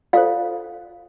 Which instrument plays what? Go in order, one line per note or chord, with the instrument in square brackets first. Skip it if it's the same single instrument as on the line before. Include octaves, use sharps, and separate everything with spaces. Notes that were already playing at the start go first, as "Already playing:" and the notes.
[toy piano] F4 A4 C5 D5 F5